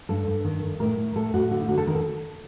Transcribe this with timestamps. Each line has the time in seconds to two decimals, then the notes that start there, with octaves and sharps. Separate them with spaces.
0.09 G2 A4
0.27 G2
0.45 D#3
0.63 D#3
0.80 A2 A#4
0.97 A2
1.15 A2 A4
1.34 A2 F#4
1.51 D3 F#4
1.60 D#4
1.69 D3 F#4
1.78 A4
1.87 D#3 A#4
1.95 A4